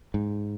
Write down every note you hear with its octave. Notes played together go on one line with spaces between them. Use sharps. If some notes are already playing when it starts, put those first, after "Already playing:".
G#2